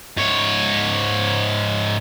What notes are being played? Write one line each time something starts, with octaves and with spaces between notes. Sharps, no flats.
G#2 C#5